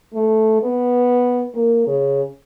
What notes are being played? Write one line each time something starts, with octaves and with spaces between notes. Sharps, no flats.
A3
B3
A#3
C#3